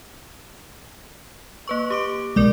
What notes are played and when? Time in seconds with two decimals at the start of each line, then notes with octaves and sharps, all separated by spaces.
1.68 A#3 B4 C#6
1.90 G4 D6 D7
2.36 B1 G#3 A#4 D5 D6